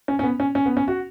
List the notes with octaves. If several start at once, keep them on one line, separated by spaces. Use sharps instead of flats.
C#4
C#4
B3
C#4
C#4
B3
C#4
F#4